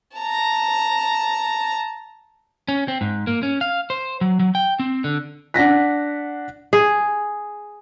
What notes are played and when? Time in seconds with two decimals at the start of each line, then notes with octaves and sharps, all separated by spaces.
0.17 A5 A#5
2.68 C#4
2.88 C4
3.01 G#2
3.27 A#3
3.43 C#4
3.61 F5
3.90 C5
4.21 F#3
4.40 F#3
4.55 G5
4.80 C4
5.04 D3
5.54 D4 F#5 A#6 B6
6.73 G#4